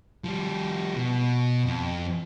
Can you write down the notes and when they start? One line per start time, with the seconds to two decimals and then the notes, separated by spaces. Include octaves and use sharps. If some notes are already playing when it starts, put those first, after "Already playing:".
0.24 F3 G3
0.96 B2
1.66 F2